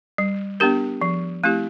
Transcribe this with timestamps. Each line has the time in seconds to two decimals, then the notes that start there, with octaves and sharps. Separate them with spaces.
0.18 G3
0.60 B3 D4 G4 A#4
1.01 F3
1.44 A3 C4 E4 G4